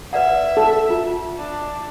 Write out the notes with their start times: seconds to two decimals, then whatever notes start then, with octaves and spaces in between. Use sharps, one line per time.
0.13 B4 D5 E5 F#5
0.57 A4
0.90 F4
1.38 D4